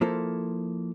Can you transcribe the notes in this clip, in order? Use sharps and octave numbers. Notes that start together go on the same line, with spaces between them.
F3 A#3 E4 A4 C5